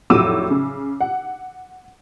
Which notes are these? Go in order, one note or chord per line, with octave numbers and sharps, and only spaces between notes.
F1 A2 F#3 D6 E6 D#7
C#3
F#5